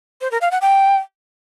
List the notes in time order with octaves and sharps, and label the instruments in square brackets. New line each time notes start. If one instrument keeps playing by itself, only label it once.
[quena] C5
A#4
F5
F#5
G5